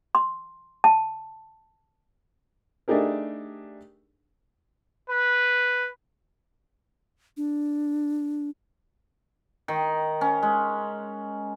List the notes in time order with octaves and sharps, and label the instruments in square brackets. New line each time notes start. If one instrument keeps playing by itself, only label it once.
[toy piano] C6
A5
[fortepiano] A3 D4 D#4 G4 G#4 A#4
[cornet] B4
[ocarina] D4
[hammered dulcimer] D#3
C#4
G#3